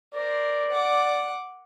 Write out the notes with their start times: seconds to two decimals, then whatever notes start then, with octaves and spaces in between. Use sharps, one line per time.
0.14 A#4 C5 D5
0.71 F#5 D6